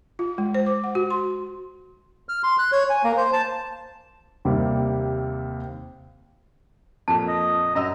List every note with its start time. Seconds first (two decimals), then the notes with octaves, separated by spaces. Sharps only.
0.19 F4
0.38 G#3
0.55 C5
0.66 D6
0.84 F#5
0.95 F#4
1.10 C6
2.29 F6
2.43 C6
2.59 F#6
2.72 C#5
2.90 G#5
3.04 A#3
3.17 C5
3.33 A5
4.45 D#2 C3 G3 A#3 C4
7.08 F2 A#2 A5
7.28 D#5
7.75 F#2 D#5 A#5 E6